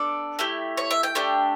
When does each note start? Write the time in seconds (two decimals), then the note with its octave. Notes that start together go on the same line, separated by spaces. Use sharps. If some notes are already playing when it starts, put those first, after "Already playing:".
Already playing: B3 D4 A4 D5
0.39 A3 E4 G4
0.77 C#5
0.91 E5
1.03 G5
1.15 A3 D4 G4